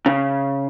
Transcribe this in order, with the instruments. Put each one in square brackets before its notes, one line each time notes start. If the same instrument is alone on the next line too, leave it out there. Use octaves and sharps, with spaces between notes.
[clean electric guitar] C#3